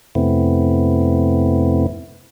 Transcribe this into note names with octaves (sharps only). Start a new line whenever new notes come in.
F2 C3 A3 B3 C4 E4